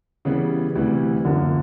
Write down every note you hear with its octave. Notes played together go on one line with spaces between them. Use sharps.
C#3 E3 G3 B3
D2 C3 E3 G3
F#2 D3 F3 A#3